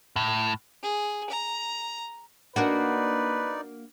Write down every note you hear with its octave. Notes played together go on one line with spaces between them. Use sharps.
A2
G#4
A#5
A#3 D4 D#4 F#4 B4 D5